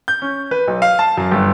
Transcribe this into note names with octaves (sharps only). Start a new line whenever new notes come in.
G6
C#4
B4
B1
F5
A5
F#2
G1